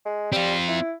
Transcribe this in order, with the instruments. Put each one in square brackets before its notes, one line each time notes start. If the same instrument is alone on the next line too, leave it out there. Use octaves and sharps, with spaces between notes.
[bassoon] G#3
[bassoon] G3 [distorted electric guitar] C4 F4
[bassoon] E4